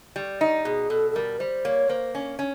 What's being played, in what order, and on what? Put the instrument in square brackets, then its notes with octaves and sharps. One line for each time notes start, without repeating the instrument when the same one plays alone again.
[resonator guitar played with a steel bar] G3
D#4
[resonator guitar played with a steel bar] B2 [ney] G#4
[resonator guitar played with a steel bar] B2 [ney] A4
[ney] A4
[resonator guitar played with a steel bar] G3 [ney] A#4
[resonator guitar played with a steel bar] G3 [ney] C5
[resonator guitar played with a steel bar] A#3 [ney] C#5
[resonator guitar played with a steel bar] A#3 [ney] C5
[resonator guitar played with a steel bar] C#4
C#4